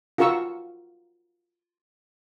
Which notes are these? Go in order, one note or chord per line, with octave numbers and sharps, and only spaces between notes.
F4 F#4 A#4 F5 C#6 E6